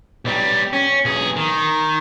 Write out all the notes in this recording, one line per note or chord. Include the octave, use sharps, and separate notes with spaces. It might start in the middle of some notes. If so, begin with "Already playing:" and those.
B1 G3
C#4
B1 G#4
D#3